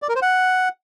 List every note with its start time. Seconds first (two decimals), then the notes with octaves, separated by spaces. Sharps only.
0.02 D5
0.09 A#4
0.15 C5
0.22 F#5